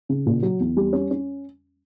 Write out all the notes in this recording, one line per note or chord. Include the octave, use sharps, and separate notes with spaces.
C#3
A#2
F#3
E2
G3
C#4
C#4